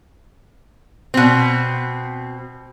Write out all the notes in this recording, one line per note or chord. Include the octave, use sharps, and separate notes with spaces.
B2 C4